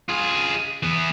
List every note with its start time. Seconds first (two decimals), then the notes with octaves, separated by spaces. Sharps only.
0.09 F4 G#4
0.83 E3 B3